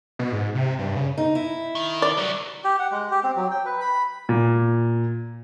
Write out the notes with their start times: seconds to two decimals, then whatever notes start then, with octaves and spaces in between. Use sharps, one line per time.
0.19 B2
0.32 G#2
0.55 C3
0.78 G2
0.96 C#3
1.18 D#4
1.35 E4
1.75 D#3
2.02 D5
2.17 F#3 G3
2.64 G4
2.79 F#5
2.92 G#3
3.11 G4
3.24 C4
3.36 F#3
3.51 G5
3.66 B4
3.81 B5
4.29 A#2